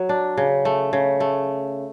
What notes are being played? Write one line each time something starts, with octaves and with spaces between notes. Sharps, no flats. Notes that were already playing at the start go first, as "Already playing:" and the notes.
Already playing: F#3
D4
C#3
A3
C#3
A3